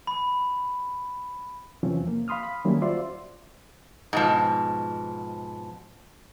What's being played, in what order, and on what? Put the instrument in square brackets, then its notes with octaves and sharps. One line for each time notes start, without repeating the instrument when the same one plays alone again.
[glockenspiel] B5
[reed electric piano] E2 C3 E3 F3 C4 C#4
A#3
F5 B5 C6 D#6 F6
B5
D#3 F#3 G3 A#3 C#4 E4
F4 F#4 C5 D5 E5 C6
[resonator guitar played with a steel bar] G#2 B2 F3